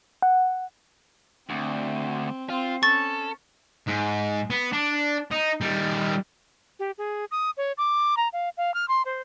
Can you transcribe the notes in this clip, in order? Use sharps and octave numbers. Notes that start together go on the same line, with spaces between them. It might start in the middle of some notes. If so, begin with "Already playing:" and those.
F#5
D2 C4
C4 F4
C#4 A4 C#6 A6
G#2
B3
D4
D#4
D#3 G3
G4
G#4
D#6
C#5
D6
A#5
F5
F5
F6
C6
C5